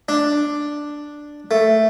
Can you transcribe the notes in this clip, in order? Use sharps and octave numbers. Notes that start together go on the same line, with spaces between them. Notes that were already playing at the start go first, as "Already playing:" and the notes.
D4
A3